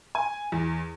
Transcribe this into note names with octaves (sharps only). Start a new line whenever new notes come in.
G#5
E2